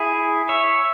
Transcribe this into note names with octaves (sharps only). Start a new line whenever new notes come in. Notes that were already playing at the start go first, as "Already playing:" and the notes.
Already playing: E4 G#4
C#5 E5